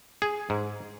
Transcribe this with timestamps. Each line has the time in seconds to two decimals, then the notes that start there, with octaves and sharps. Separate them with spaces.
0.22 G#4
0.50 G#2